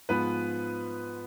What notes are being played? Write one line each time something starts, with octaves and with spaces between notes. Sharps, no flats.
G#2 F3 G#3 B3 B4